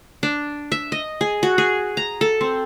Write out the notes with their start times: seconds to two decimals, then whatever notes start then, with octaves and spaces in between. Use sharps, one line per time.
0.23 D4
0.72 E5
0.92 D#5
1.21 G#4
1.43 F#4
1.58 G#4
1.97 A#5
2.21 A4
2.41 C4